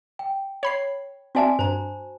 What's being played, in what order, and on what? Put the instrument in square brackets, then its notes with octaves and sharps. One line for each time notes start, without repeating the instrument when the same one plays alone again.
[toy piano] G5
[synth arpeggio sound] C#5 B5 C7
[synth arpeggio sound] C4 D5 E5 [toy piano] F#4 G#5 A5
[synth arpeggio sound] G2 [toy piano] C5 A#5